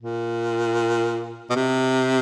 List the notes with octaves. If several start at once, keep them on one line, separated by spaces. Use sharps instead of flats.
A#2
B2
C3